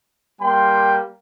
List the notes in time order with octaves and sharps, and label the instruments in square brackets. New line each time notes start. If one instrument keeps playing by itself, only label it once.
[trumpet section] G3 A#3 G5 [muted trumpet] C6